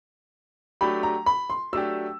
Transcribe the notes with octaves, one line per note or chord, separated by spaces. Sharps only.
F#3 A3 D4 G4 B5
A#5
B5
C6
F#3 A3 D4 G4 E6